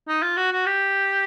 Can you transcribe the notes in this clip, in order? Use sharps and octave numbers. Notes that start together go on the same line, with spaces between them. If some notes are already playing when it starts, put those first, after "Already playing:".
D#4
F4
F#4
F#4
G4